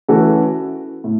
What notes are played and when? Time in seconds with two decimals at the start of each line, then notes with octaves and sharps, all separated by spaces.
0.08 E3 A3 C#4 F#4 A4
1.04 A2